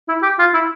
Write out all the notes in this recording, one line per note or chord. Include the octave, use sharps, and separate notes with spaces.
E4
G4
F4
E4